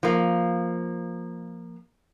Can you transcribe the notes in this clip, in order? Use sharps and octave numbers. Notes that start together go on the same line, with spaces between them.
F3 A#3